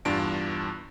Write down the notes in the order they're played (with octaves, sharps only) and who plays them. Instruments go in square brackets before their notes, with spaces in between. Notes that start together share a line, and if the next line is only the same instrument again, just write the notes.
[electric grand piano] E2 G2 D4 F4 A5 D7